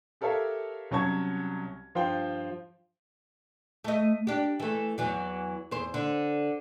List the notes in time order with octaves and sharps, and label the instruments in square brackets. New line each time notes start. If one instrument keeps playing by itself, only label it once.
[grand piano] G4 A4 A#4 C#5 E5 F5
C2 F#3 C#4 A5 C#6 G#6
G2 F3 F4 C5 G5
[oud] A3 D#5
D4 G4
E3 A3
E2 E3 F#3
E2 C5
D3